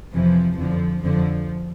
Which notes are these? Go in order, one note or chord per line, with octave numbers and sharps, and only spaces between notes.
F2 C3 E3 F3
F2 D3 F3
F2 D3 F3